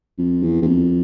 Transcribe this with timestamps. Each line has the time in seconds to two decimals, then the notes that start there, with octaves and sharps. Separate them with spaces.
0.18 F2
0.43 E2
0.62 E2
0.67 F2